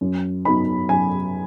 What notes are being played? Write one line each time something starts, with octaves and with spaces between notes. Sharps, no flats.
F#2
F#3 B3 D#4 B5
F#2 G#5